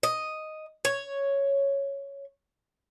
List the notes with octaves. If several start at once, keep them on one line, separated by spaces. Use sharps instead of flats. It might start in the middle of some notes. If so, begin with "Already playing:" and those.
D#5
C#5